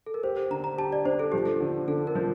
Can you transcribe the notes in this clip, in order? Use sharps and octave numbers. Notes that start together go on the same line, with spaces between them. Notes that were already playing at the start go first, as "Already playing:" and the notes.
A4
A#4
G4 C5
C5
D3 A#5
A#5
G4 A5
D5
D4 C5
A4
F3 G4
A4
D3
D3 A4
A#4
F3